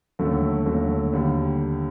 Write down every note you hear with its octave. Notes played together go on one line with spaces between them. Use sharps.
D#2 D3 F#3 A3
D#2 D3 F#3 A3
D#2 D3 G3